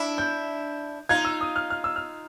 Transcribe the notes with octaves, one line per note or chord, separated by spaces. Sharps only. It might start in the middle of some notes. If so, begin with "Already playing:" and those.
Already playing: D4 E4
G6
D#4 F4 G#6
E6
D#6
F6
F6
E6
F6